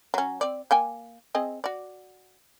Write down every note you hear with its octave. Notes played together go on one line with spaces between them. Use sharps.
F#3 C#4
C4 D5
A#3 G5 G#5
C4 G#4 D#5
F#4 D5